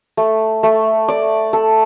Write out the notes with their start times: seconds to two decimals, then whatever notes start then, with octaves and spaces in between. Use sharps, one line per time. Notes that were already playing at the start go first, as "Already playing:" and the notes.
0.17 A3
0.63 A3
1.08 D5
1.53 A4